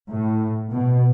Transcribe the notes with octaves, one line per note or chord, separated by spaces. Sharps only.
A2
B2